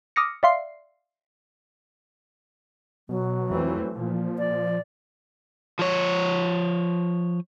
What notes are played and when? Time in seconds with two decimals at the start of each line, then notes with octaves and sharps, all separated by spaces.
0.16 D6 D#6 F6 A#6 C#7
0.43 D5 E5 F5 C6 C7
3.09 B2 F#3
3.51 F2 E3 A3 C4
3.95 A#2 F3
4.38 D5
5.79 F3 C#5